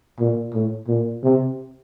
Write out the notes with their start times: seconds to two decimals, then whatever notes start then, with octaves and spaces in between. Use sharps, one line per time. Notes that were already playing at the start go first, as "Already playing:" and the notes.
0.19 A#2
0.54 A2
0.88 A#2
1.23 C3